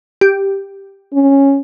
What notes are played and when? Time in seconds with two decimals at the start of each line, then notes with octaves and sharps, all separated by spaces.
0.21 G4
1.13 C#4